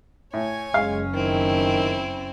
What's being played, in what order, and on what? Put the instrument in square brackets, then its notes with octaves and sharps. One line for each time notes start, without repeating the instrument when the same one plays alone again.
[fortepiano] A2 [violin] C#5 G#5
[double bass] F#1 C#4 [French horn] G#3 [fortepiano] F5
[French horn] D#3 [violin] C4 E4